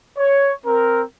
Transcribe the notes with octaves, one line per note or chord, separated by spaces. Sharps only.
C#5
C4 A#4